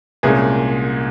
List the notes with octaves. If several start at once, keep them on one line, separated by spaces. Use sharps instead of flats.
C2 A#2 G#3 C#4 G#4